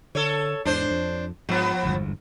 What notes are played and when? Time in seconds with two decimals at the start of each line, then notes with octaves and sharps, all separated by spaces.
0.15 D3 A4 C#5
0.65 E2 G#2 D4 C5
0.91 F2
1.49 G#2 F3 B3
1.83 G1 E2 G#2